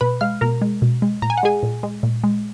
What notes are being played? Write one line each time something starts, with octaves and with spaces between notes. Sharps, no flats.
B2 B4 B5
G#3 F5 F6
B2 A#4 A#5
G#3
B2
G#3
A#2 A#5
G#5
F#5
G#3 G#4 G#5
A#2
G#3
A#2
G#3